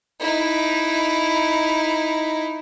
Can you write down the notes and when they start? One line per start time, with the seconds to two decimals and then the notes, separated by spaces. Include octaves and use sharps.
0.20 D#4 E4